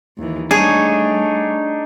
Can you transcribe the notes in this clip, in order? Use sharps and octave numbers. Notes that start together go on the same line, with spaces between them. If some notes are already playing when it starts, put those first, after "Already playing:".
D#2 E3
G3 A3 D4 D#4 G#4 C#5